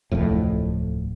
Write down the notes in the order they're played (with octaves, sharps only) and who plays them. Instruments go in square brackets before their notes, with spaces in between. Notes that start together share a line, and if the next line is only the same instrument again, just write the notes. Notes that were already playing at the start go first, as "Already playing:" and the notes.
[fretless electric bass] D1 C2 F2 A2